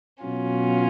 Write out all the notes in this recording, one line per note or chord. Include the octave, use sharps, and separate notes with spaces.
B2 F#3 C#4 F4